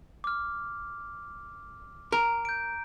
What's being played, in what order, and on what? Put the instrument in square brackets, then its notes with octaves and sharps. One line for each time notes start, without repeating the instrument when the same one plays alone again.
[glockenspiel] D6 F6
[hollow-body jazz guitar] A#4 [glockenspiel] A#5
[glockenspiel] G6 D7